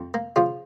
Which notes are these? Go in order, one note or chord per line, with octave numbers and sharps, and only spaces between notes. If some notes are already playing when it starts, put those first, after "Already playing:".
Already playing: F2
A#3
C#3 F3 F4